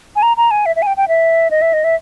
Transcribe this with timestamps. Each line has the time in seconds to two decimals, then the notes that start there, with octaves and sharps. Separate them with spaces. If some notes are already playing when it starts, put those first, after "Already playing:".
0.16 G#5
0.23 A#5
0.37 A#5
0.51 G#5
0.66 E5
0.76 E5
0.82 G#5
0.87 G5
0.97 G5
1.08 E5
1.51 D#5
1.62 E5
1.73 D#5
1.84 E5